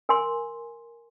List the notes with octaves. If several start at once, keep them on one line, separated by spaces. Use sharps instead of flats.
A#4 G#5 C6